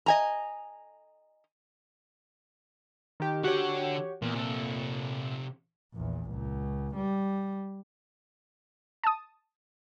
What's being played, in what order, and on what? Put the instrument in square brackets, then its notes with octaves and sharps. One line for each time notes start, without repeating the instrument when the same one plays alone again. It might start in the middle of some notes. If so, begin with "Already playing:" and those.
[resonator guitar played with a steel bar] D#5 G#5 A#5
[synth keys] D#3 G4
[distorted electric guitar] D3 F#5 [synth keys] F#4 G4 C#5
[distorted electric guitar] E2 [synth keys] A#2
[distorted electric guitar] C3 A4
[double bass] A#1 E2
C#2
G3
[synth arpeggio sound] A5 D#6